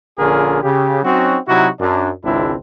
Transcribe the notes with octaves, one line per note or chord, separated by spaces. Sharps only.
A#1 D3 C#4 F4 G#4 A#4
C#3 G4
F#3 C4 C#4 D#4 F#4
C3 F#3 D#4 E4 F#4
F#2 D4
G#1 C#2 C4 D4 E4